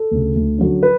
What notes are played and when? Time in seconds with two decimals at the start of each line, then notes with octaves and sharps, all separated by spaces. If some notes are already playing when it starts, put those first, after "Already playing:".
Already playing: A4
0.11 D2 C#3
0.35 D2
0.58 D3 F#3 C#4
0.83 B4